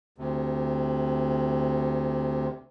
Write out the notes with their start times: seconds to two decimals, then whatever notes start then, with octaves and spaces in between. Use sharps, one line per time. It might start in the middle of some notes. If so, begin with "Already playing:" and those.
0.18 D2 C3